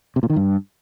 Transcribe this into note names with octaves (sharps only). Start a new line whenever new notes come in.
C3
A#2
D#3
G2